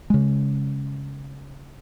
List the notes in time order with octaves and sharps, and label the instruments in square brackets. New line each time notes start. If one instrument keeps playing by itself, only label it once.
[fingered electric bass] C#3 G#3